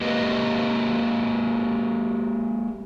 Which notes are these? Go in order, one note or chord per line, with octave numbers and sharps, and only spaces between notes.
G#3 A#3 G4 B4 D#5 F5